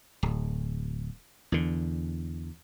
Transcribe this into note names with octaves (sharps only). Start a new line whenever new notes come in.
D1
E2 D3